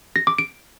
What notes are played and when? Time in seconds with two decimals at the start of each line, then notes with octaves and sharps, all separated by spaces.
0.16 A#6
0.27 D6
0.38 D7